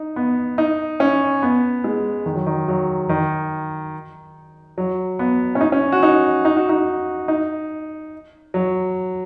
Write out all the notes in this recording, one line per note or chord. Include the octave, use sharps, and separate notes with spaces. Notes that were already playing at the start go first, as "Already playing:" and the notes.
Already playing: D#4
B3
D#4
C#4
B3
G#3
D#3
F#3
D#3
F#3
D#3
F#3
B3
C#4
D#4
C#4
F#4
D#4
D#4
F#4
D#4
D#4
F#3